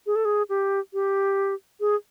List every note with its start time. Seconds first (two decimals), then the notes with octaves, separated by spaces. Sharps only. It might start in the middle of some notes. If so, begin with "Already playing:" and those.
0.06 G#4
0.16 A4
0.25 G#4
0.49 G4
0.93 G4
1.80 G#4